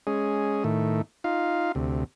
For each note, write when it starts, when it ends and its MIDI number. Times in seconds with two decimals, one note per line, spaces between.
0.07 0.64 56
0.07 0.64 61
0.07 0.64 68
0.64 1.02 45
0.64 1.02 51
0.64 1.02 57
1.24 1.72 63
1.24 1.72 65
1.24 1.72 77
1.75 2.04 38
1.75 2.04 48